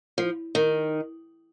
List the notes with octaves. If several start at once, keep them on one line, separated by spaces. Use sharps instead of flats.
F3
D#3